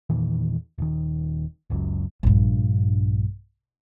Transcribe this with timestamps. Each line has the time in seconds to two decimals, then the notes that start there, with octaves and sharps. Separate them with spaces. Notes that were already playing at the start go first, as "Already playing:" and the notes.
0.10 E2 A#2 D#3 E3
0.78 D#1 D#3
1.70 F#1 C#2 F#2
2.23 A#1 G2